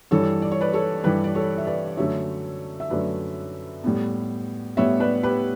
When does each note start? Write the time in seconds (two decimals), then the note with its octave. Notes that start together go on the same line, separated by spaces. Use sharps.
0.11 G2 E3 G3 A4 C#5
0.42 D5
0.51 C#5
0.61 B4 D5
0.73 A4 C#5
1.04 G2 E3 G3 G4 B4
1.24 D5
1.35 A4 C#5
1.58 E5
1.67 B4 D5
1.97 F#2 D3 A3 C#5 E5
2.80 E5
2.90 F#2 D3 A3 B4 D5
3.84 A2 G3 B3
4.77 A2 G3 B3 C#5 E5
5.00 B4 D5
5.23 G4 B4